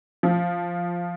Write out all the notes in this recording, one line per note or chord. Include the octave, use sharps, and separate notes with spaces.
F3